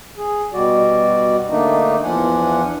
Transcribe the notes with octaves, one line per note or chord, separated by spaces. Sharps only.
G#4
B2 G3 F#4 D5
D3 A3 A#3 D4 D#4
E2 F3 D4 F#5 G#5